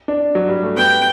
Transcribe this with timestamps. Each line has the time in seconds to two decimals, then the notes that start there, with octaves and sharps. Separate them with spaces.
0.08 D4
0.35 F#3
0.49 G3
0.63 A3
0.77 B3 G5